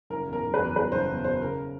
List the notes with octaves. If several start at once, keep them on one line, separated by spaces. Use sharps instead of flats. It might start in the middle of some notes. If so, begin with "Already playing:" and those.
F#1 A#4
E2
A#4
F#1
B4
E2
E2 B4
F#1 C5
E2
B2 C5
C#3 A#4